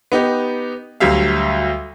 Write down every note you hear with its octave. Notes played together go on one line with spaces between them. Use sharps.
B3 D#4 G4
D2 F#3 G3 E5 F5